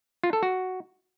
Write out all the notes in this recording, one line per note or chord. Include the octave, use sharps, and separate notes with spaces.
F4
A4
F#4